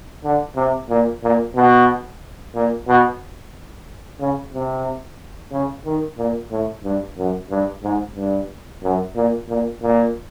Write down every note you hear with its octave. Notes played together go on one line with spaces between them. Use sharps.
D3
C3
A#2
A#2
B2
A#2
B2
C#3
C3
C#3
D#3
A#2
A2
G2
F#2
G2
G#2
G2
F#2
A#2
A#2
A#2